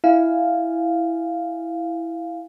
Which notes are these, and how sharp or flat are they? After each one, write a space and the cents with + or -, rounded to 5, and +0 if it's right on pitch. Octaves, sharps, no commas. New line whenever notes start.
E4 +0 F5 +0 G#5 +0